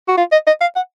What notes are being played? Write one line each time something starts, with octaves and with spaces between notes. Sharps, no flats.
F#4
F4
D#5
D#5
F5
F#5